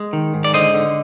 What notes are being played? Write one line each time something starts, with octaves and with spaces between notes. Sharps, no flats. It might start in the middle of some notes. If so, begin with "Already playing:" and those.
Already playing: G#3
D#3
G#2
D5
D3 C5 D#5
D3